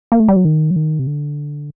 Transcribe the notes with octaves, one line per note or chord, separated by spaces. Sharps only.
A#3
A3
G3
F#3
D#3
F#3
D#3
C3
D3